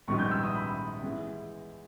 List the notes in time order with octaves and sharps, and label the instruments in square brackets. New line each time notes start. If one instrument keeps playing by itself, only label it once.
[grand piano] A#1 G#2 D#3 G3 B3 C#6
G6
E6
D#6
B5
E3 G#3 B3